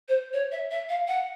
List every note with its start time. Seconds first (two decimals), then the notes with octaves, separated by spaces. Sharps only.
0.08 C5
0.33 C#5
0.52 E5
0.71 E5
0.89 F5
1.08 F#5